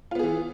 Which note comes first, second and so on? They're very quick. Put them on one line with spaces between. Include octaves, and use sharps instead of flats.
F4 B3 G#4 E3